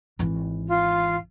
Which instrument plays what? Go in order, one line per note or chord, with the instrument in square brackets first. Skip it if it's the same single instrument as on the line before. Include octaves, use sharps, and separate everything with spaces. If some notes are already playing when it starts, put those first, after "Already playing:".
[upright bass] G#1 E3
[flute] F4